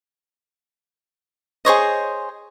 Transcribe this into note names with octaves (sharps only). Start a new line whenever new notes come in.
G#4 C5 C#5 D#5